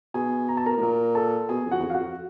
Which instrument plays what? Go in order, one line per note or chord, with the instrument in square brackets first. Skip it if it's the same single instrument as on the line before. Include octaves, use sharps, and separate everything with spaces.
[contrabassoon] B2 [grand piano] G#4 G#5
[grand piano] A#5
A5
A#4 A#5
[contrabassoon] A2
[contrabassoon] A#2 [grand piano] A#4 A#5
[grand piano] A4 A5
[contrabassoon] B2 [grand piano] G#4 G#5
[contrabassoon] F2
[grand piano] F#4 F#5
[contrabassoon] E2
F2
[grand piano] F5
F#4 F#5
[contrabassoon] F2